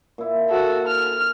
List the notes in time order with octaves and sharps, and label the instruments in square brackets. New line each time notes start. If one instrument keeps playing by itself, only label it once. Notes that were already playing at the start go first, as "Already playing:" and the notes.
[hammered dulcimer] A#2 E4
[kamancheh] F#4 A4
F6